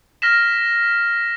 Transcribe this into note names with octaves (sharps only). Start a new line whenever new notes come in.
F6 A#6 B6 E7